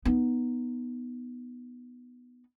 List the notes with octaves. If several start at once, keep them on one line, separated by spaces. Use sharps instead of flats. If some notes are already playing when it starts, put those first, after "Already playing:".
B3 D#4